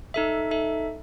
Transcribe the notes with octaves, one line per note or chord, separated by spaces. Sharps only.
D#4 A4 E5
D#4 A4 E5